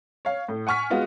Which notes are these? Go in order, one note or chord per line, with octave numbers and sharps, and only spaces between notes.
C#5 F5
A2
F#5 G#5 C#6 F6 B6
G#3 B3 F4 F#4